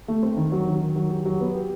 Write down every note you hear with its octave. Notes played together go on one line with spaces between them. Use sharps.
A3
C4
D#3
F#3
D#3
D#3
F#3
G4
F#3
B3
G4